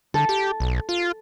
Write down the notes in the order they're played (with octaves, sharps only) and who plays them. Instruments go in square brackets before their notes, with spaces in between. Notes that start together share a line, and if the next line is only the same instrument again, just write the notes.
[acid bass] D3 [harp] A4
[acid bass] G4
B1
F4